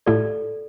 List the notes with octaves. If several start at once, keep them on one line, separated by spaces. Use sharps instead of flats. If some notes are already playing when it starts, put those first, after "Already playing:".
A2 A3 E4 G4 A4 D5